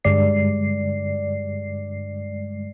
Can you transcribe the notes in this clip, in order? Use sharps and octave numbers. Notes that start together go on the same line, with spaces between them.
G2 D3 G3 G#3 D5 C7